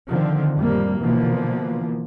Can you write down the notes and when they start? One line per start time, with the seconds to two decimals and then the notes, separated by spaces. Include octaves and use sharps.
0.11 D3 D#3 F3 C4
0.56 F2 A2 F3 G3 A#3
1.01 B2 D3 E3 F3 A#3